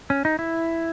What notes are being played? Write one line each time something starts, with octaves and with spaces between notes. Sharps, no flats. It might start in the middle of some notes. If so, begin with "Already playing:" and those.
C#4
D#4
E4